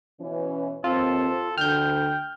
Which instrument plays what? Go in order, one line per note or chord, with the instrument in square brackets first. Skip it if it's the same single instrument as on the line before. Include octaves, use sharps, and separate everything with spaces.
[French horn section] B2 E3 C#4
[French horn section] D#2 C4 [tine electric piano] F4 [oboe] A4
[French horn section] D2 D3 [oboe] G5 [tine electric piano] F6 G6